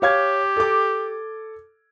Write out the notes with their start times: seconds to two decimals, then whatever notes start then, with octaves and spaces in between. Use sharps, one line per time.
0.02 G4 C#5 F5 G#6
0.56 A4 D6